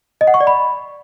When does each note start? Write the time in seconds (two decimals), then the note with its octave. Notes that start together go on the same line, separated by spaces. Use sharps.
0.21 D#5
0.27 F#5
0.34 C#6
0.41 D5
0.47 B5